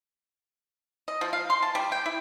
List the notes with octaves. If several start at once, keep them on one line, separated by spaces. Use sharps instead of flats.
D#5
F3
F5
C6
A5
G3
G5
E4